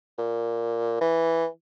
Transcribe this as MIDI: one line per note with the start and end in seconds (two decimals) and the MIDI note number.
0.19 0.96 46
1.01 1.47 52